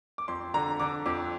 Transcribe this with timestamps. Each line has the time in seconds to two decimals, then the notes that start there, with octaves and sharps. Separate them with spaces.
0.18 D6
0.28 F2 C6
0.54 D3 A#5
0.80 D3 D6
1.06 F2 D6